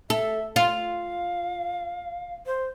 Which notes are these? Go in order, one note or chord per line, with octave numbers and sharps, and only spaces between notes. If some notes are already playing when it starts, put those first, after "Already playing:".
A4 E5
F4 F5
C5